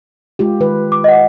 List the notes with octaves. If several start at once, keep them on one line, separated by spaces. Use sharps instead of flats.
G#3 F4 G4
D#3 B4
D6
D#5 F#5